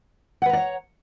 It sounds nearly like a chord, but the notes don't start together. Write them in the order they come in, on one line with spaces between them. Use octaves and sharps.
F#5 B4 A#5 D5 C#5